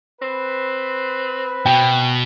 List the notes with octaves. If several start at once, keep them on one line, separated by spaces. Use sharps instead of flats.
C4 B4
B2 G5